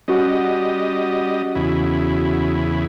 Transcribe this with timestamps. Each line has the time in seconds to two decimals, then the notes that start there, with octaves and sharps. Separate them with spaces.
0.08 G3 C#4 F#4 D#5 F#5
1.55 E2 C#3 E4